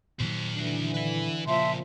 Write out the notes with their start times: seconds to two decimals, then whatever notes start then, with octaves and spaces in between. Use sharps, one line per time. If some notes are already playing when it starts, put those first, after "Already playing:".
0.20 A#2 D#3 F#3 A4 C5
0.57 D3 E3 D4 F#4
0.94 B4 E5
1.47 A#2 C#3 F3 C4 E5 A5 C6